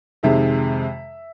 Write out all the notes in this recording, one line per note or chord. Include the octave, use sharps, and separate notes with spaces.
F2 C3 D#3 G#3 E5